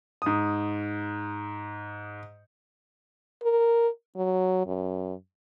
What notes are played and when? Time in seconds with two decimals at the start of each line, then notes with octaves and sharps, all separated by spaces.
0.22 G#2 D#6
3.43 A#4
4.17 F#3
4.67 F#2